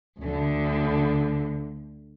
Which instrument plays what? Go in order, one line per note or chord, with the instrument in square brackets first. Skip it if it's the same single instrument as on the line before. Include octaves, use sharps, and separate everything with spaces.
[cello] D2 D3